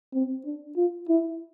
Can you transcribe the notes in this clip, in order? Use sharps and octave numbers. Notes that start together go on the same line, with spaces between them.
C4
D4
F4
E4